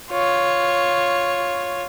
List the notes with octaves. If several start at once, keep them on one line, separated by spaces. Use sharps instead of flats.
F4 C#5